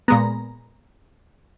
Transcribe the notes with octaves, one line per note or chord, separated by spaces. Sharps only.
A#2 G#3 B3 A#5